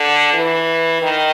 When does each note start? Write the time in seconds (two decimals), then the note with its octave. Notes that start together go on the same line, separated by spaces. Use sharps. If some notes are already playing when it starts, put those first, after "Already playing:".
Already playing: D3
0.34 E3
1.02 D#3